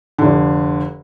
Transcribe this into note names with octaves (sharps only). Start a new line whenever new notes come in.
F1 D3